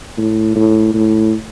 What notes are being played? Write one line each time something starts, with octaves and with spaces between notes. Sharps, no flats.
A2
A2
A2